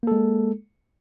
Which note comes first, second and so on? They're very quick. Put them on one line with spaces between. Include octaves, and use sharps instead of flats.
A#3 A4 G#3